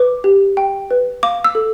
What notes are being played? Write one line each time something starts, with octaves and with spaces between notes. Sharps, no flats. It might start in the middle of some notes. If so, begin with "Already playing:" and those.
Already playing: B4 D6
G4
G5
B4
F5 D6
E6
A4